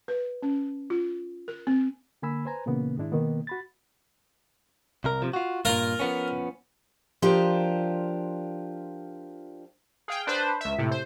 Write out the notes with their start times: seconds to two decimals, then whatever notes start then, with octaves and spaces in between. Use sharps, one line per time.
0.08 B4
0.42 C#4
0.90 F4
1.48 A#4
1.67 C4
2.22 D3 A#3 G#5 B5 E6
2.45 B4 C5 G#5 A#5
2.66 A#2 C#3 E3 A#3 B3
2.97 G#2 D#3 G#3 D4 E4
3.12 B2 D#3 A#3 B3
3.47 F#4 B5 A6
5.04 C2 A#4
5.22 C3 F3
5.33 F4 F#4
5.65 G2 A#2 F4 A#4
5.99 F3 B3 C#4
7.22 F3 D4 F4 G4 A#4
10.08 G#4 F5 G5
10.27 D4 B4 C5
10.61 C#2 E5
10.78 A2 C3
10.91 C5